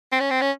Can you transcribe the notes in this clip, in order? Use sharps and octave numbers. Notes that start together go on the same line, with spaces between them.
C4
C#4
C4
C#4